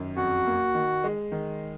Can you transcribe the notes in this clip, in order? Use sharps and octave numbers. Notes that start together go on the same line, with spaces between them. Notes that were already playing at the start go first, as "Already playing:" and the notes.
Already playing: F#2 D#3
F2 F#4
A#3
D#3
G#3
D#3